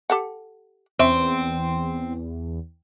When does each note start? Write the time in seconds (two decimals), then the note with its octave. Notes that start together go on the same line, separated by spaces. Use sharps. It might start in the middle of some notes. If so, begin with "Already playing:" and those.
0.10 G4 A4 F#5
0.99 E2 C4 C#4 E5